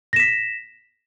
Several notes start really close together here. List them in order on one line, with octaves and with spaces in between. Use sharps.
A#6 E7 B6